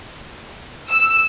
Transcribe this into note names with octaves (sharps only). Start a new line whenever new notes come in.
E6